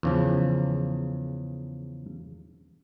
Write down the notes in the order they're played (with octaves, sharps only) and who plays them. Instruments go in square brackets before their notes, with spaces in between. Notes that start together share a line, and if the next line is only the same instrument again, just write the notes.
[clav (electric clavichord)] E2 C#3 F3